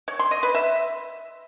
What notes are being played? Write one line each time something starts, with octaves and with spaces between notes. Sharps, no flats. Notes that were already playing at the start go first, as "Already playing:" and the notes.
C#5
C6
D#5
B4
E5